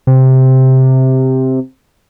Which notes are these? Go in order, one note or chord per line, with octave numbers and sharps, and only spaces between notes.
C3